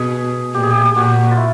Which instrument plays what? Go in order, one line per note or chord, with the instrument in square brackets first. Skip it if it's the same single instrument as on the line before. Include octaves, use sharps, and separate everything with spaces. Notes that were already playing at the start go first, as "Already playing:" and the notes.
Already playing: [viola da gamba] B2 [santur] G#4
[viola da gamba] A#2 [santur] G4
[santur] G#4
G4
G#4
G4
[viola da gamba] A#2 [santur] F#4
[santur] F4
E4